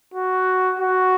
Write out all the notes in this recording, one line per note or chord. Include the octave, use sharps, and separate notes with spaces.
F#4
F#4